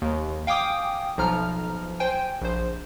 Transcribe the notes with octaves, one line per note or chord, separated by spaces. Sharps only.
D#2
F5 G5 G#5 D6 D#6
B1 F3 A#5 F6
C5 G5 G#5
A#1 C5